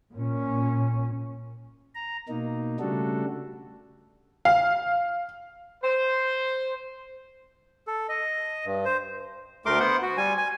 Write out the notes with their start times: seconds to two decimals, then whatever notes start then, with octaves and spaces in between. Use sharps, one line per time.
0.12 A#2 C#4
1.95 A#5
2.29 B2 A#3 D#4
2.80 C#3 G3 A3 D4 F#4 A4
4.45 F5
5.84 C5
7.87 A4
8.09 D#5
8.66 G2
8.85 C5
9.66 D2 A3 A#4 C6 D6
9.80 B3 C5 F#5
10.02 F#4
10.17 G3 G#5
10.37 G#5